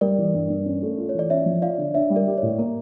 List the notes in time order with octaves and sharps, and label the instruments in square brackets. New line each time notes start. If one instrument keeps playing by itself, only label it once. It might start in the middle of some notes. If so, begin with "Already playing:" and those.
[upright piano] G3 [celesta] A#4 D5
[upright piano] E3
G2
G2
C#4
A3
F4
[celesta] C#5
[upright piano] E3 [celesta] D5
[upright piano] C#4 [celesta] C#5 E5
[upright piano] F3
[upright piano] F4 [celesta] D5 F5
[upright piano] D3
[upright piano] D4 [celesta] C#5 E5
[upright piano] G3
[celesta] A#4 D5
[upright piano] G4
[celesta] C#5
[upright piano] A2
[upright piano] A#3 [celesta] A#4